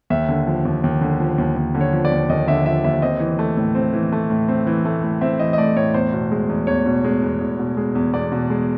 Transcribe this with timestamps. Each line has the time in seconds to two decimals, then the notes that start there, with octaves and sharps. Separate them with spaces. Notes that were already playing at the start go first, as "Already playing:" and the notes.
0.10 D#2 E5
0.29 D3
0.47 F3
0.65 D#2
0.84 D#2
1.01 D3
1.20 F3
1.38 D#2
1.56 D#2
1.75 D3
1.81 C#5
1.93 F3
2.05 D5
2.12 D#2
2.29 D#2 D#5
2.47 D3 E5
2.66 F3 E5
2.84 D#2 E5
3.02 C4 D#5
3.20 E3
3.39 A3
3.57 A2
3.75 C4
3.94 E3
4.12 A3
4.30 A2
4.48 C4
4.67 E3
4.85 A3
5.03 A2
5.21 C4 E5
5.39 E3 D#5
5.53 D#5
5.58 A3 D5
5.76 A2 C#5
5.94 E2 C5
6.13 B2
6.31 G#3
6.49 E2
6.67 E2 C#5
6.86 B2
7.04 G#3
7.23 E2
7.40 E2
7.59 B2
7.77 G#3
7.95 E2
8.13 E2 D5
8.32 B2
8.50 G#3